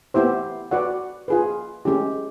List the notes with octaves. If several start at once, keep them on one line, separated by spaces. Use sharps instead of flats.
B3 E4 G4 C5
F#4 B4 D5 F#5
F4 G#4 B4
G#3 C#4 E4 G4